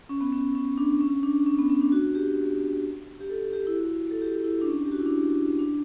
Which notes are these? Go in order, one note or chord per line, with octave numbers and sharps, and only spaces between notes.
C#4
B3
C#4
C#4
D4
C#4
D4
C#4
B3
C#4
D4
F#4
G4
G4
A4
G4
E4
F#4
A4
G4
E4
D4
C#4
G4
F#4
E4
D4
C#4
D4